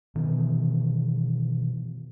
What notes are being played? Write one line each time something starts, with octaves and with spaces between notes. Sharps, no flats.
B2 D#3 E3